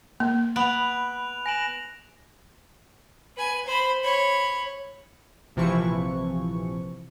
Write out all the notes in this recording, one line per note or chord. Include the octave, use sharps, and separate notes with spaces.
A#3
B3 B5 F#6 D7 F7
G#5 A#6 D7 E7 F#7
B4 G#5
C5 B5
C#5 B5
A#1 C3 E3 F3 C#6